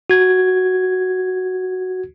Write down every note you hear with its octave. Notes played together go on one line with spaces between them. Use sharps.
F#4 G#6